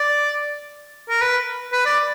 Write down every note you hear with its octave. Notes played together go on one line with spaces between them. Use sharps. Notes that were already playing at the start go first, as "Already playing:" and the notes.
Already playing: D5
A#4
B4
B4
D5